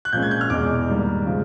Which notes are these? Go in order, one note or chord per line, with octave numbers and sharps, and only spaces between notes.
F#6
A#2 F3 G#3 C#4 G6
G#6
G6
F6
E2 B2 G#3 D6
G#2 D#3 G3 A#3
C#3 F3 G#3